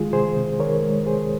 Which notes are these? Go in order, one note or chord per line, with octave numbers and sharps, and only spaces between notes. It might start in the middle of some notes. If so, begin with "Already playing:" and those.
Already playing: D#3 G#3 F4 G#4
C3 G#4 C5
C3
D#3 A#4 C#5
G#3
C3 G#4 C5